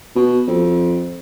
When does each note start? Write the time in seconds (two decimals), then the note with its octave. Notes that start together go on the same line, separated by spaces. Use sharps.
0.16 B2
0.48 F2